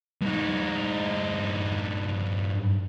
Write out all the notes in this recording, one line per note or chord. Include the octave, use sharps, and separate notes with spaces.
G2 D#4